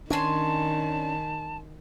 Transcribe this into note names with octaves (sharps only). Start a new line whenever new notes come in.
D#3 C#4 D4 C#5 G#5 A5 C6